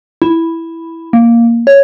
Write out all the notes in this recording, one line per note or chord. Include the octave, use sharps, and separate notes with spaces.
E4
A#3
C#5